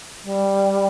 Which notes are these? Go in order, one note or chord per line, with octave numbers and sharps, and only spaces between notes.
G3